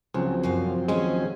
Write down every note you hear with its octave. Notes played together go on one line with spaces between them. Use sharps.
C#2 C#3 F3 F#3 C4
F#2 C3 F5
D#2 G#3 C#4 G#4